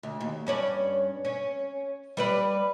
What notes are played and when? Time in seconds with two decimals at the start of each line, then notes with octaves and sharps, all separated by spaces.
0.03 D2
0.20 D#2
0.47 G2 C#4 D5
1.25 C#4
2.17 G3 B4 D5